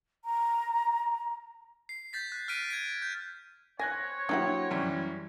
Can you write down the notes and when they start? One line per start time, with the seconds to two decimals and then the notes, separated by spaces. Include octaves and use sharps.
0.25 A#5
1.89 C7
2.13 G6 A6 B6
2.32 F#6
2.48 F6 A6 B6 D7 D#7
2.70 G#6 D7
3.02 G6
3.79 C4 C#5 G#5 F#6 G#6 A#6
4.29 F#3 A#3 D4 E4 G4 F#5
4.71 F#2 E3 G3